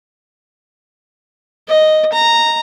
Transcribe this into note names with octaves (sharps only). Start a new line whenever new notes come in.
D#5
A#5